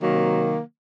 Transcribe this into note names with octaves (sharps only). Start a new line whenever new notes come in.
C3 D#3 F#3 A#3